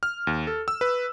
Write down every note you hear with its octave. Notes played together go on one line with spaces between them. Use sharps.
F6
D#2
A4
E6
B4